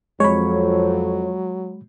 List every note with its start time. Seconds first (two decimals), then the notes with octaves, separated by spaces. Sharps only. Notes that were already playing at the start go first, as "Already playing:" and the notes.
0.20 F2 F#3 G#3 C#5 B5